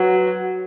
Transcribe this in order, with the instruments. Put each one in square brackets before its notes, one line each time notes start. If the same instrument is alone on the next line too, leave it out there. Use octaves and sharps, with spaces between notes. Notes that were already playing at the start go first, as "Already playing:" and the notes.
Already playing: [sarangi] F#3 [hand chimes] F#4 B4